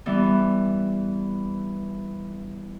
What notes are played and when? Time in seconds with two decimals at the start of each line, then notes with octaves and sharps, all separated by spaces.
0.06 E3 G3 B3